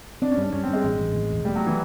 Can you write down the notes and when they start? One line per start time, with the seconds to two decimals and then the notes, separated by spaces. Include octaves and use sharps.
0.22 C4 D4
0.32 C#4
0.37 G2 D4
0.53 G2 C#4
0.63 G2 C4
0.73 G#3
0.84 A1
0.99 A1
1.14 E3
1.30 E1
1.45 G3 A3
1.56 F#3
1.67 E3